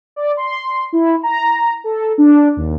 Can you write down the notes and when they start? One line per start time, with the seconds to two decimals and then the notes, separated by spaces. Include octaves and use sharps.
0.16 D5
0.37 C6
0.93 E4
1.23 A#5
1.84 A4
2.18 D4
2.56 D#2